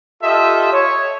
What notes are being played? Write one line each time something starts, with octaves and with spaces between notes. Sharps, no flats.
F4 G4 A4 D#5 E5
C#5